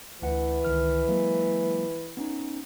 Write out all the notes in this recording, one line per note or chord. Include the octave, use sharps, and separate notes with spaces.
D2 E3 F#5
C#2 D#3 F6
F#3 G#3 A#3
B3 C#4 D#4